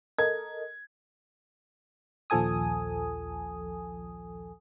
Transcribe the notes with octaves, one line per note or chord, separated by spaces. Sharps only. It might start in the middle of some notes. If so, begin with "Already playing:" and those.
A4 A#4 D#5 G#6
A#1 D#2 F3 A4 G#5 D#6